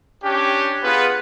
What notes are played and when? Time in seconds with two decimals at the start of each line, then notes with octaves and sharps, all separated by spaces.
0.24 C#4 D4 G4
0.83 B3 F4 G#4 B4